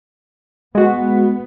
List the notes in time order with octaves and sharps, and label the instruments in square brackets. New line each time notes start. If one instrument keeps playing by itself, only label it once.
[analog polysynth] G#3 F#4 [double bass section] B3